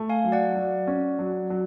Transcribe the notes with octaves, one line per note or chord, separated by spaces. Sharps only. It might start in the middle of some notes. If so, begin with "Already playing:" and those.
Already playing: A3
F5 G#5
F#3
D5 F#5
F#3
C#4
F#3
F#3